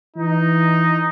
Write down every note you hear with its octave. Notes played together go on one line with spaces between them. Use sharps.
E3 D#4